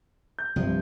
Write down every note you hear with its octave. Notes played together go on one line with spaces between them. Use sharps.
G6
C2 G2 C3 F3